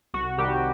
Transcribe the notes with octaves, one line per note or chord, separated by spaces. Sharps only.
C2 F#4
C3 D#3 G3 G4